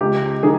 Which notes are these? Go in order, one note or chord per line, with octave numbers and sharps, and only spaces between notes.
C#2 G4
D#3 G#4